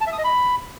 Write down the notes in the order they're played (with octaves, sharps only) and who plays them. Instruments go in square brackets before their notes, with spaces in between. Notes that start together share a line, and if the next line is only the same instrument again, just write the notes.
[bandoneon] A5
E5
D#6
D#5
B5